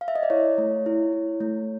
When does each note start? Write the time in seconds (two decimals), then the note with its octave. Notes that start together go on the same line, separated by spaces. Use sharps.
0.01 F5
0.08 E5
0.15 D#5
0.23 D5
0.30 E4 C#5
0.58 A3
0.86 E4
1.13 E4
1.41 A3